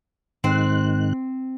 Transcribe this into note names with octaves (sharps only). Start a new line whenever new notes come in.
G#2 D#3 C4 F#6